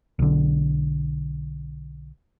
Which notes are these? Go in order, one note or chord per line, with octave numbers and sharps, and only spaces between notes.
B1 D3